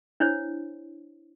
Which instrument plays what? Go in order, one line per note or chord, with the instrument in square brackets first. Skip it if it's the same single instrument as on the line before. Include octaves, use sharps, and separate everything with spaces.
[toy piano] D4 E4 C5 C#5